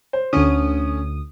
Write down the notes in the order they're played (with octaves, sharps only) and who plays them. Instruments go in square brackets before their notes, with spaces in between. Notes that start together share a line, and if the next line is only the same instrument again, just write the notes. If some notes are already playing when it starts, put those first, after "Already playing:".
[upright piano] C5
[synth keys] D2 D#6 [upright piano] D3 C#4